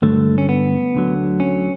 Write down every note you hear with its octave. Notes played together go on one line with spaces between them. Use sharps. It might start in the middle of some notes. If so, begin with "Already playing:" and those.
G2 D3 F#3 A3
C#4
B3
D2 D3 F#3
C#4